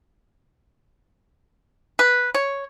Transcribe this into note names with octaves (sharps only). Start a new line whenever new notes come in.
B4
C#5